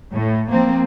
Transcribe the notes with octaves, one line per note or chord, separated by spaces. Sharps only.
A2
F3 A#3 C4